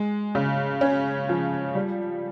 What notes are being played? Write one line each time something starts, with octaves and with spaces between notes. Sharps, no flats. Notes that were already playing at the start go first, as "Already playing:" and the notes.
Already playing: G#3
C#3
C#4
F3
G3